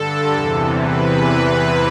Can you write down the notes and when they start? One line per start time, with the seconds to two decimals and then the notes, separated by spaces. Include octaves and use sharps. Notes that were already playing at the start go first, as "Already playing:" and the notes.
Already playing: G2 D3 A4
0.31 E2 C3 E3
0.77 E2 C3 E3 B4